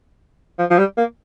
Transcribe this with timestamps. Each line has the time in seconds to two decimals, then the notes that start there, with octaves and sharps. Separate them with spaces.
0.59 F3
0.71 F3
0.78 G3
0.97 A#3